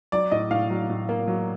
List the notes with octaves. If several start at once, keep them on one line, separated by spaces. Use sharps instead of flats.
F#3 D5
A2 D#5
A2 F5
F#3
A2
A#3
F#3